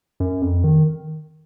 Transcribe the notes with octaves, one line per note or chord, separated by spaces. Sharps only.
F#2
F2
D#3